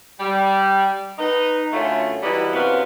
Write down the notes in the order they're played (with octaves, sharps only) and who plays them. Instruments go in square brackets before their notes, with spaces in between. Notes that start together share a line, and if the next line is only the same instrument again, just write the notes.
[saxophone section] G3
D#4 B4
F#2 D3 A3 C#4 F4
E3 F#3 G3 B4 D#5
F#2 C3 B3 F#4 F5 F#5